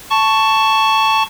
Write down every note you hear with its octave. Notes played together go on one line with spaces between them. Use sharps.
A5 C#6